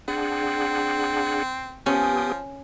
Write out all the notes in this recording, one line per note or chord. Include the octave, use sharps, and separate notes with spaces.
C4 D4 G#4 F#5
F3 B3 C#4 G4 D#6